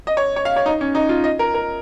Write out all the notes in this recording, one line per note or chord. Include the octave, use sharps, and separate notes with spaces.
D#5
C#5
C#5
F5
C#5
D#4
C#4
D#4
F4
D#5
A#4
A#4